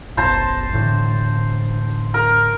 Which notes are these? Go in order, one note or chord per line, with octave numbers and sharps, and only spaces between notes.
F#1 B1 C5 A5 A#5
E1 A2 D3
A#4